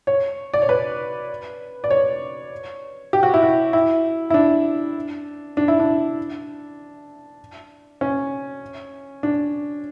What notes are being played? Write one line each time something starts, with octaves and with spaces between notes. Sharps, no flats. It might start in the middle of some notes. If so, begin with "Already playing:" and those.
C#5
D5
C#5
B4
D5
C#5
G4
F#4
E4
F#4
E4
E4
D4
D4
E4
D4
C#4
D4